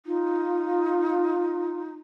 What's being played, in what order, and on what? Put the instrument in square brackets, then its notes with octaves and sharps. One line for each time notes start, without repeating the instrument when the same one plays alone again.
[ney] D#4 [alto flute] F4